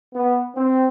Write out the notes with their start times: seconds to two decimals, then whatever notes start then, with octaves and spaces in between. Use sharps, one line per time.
0.13 B3
0.56 C4